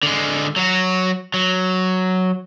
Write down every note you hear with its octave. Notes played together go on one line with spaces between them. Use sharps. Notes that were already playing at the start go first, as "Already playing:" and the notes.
D3 G#3
F#3 F#4
F#3